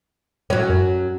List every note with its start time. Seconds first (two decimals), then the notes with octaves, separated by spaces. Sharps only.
0.50 A2 F#3 C#4
0.70 F#2